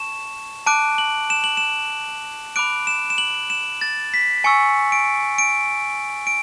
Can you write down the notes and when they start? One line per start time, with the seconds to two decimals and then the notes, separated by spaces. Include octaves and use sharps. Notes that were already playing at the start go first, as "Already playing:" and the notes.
Already playing: A5 C#6 E7
0.67 A5 D6 F#6 D7
0.98 F#7
1.30 E7
1.44 F#7
1.57 E7
2.56 B5 D6 F#6 D7
2.87 E7
3.10 E7
3.18 F#7
3.50 E7
3.81 A6
4.14 B6
4.44 G#5 C#6 E6 C#7
4.92 D7
5.38 D7
6.27 D7